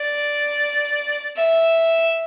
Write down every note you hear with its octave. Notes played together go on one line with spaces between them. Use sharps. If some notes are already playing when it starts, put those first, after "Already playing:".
Already playing: D5
E5